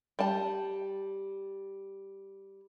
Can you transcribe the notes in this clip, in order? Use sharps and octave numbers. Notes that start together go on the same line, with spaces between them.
G3 A5